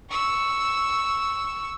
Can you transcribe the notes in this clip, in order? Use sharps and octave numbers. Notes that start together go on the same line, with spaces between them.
C#6 E6